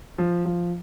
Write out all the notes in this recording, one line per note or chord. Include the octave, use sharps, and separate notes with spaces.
F3
F3